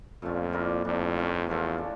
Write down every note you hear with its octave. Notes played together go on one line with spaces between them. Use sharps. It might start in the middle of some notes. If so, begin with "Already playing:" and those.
F2 A#2 A3 C#4 F4
A#3 E4 A#4 D5
F2 E3 A3 D4
A3 C#4 F4 C#5
E2 F3 C#4 F4 A4
E3 A3 D4